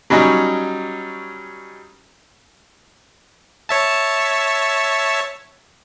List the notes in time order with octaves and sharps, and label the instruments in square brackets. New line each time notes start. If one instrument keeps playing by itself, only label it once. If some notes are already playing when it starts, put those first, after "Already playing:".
[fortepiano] F#3 G3 C#4 D#4
[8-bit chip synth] C#5 E5 A5